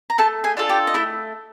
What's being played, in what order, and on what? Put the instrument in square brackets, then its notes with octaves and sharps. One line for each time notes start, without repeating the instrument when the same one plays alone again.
[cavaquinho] A#5
[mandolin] A3 [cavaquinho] A4 A5
[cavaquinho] G#4 G#5
[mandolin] D4 F4 A4
[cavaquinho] G4 G5
D#5
[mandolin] A3 [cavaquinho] E4 E5